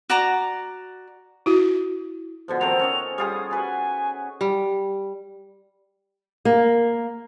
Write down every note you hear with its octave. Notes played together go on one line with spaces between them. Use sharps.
F#4 D5 A#5
E4 F#4
B2 D3 F3
D#3 C4 A4 F7
C#4 C#5 D#5
G3 F4 G#4 D#6
F#4 B4 G#5
G3
A#3